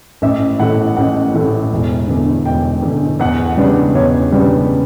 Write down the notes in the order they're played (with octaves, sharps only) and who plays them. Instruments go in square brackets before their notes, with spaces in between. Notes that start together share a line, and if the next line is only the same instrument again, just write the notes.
[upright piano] A1 E5
A2 E3 A3 F#5
A1 F#5
A2 E3 A3
E1
E2 D3
E1 G5
E2 D3
E2 F#5
F#5
C#3 G3 B3 D4
D5
E2 C#5
C#3 G3 B3 D4